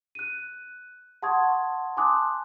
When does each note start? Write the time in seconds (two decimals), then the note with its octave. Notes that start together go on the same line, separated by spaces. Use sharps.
0.15 F#6 D#7
1.22 F#5 A5 C6 C#6 D#6 G#6
1.97 G#5 A5 C6 D6 D#6 F#6